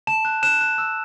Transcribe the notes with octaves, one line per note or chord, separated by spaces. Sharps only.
A5 E7
F#6
F#6 E7
F#6
E6